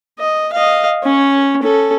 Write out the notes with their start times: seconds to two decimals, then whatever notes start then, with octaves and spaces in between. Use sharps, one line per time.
0.19 D#5
0.53 D#5 F5
1.03 C#4 C#5
1.62 C#4 A4